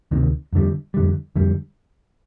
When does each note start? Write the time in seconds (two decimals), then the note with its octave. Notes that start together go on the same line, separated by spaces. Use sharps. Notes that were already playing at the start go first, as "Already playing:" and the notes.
0.11 D2 C3 D#3
0.53 F2 D3 G3
0.94 F2 D3 G3
1.36 F2 D3 G3